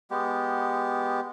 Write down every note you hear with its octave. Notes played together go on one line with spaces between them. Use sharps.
G#3 B3 G4